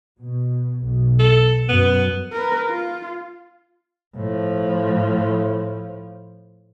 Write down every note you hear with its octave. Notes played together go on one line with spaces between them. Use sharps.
B2
B1
A4
F#2 B3
A#4 B4
F4
A2 F3